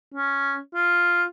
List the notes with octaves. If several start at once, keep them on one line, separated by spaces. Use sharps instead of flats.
C#4
F4